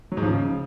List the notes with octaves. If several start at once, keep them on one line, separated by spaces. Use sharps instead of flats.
F#3
G#2
F3
C#3